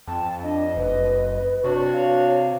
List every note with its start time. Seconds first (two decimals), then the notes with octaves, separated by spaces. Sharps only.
0.07 F2 G5 A5
0.43 D4 D#5
0.77 F#1 B4
1.64 C3 D4 F#4 C#5
1.93 F5